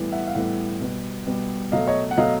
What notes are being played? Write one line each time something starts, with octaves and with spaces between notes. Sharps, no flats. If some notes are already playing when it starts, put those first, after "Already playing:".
Already playing: A2 E3 G3 B3
E5 F#5
F5
A2 E3 G3 B3 E5 F#5
B2 G3 B3
B2 G3 B3
B2 F#3 A3 D#5 F5
C#5 D#5
F#5
B2 F#3 A3 D#5 F5